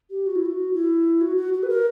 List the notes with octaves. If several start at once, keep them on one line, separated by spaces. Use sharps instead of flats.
G4
F#4
E4
F#4
E4
F#4
F#4
F#4
B4
A#4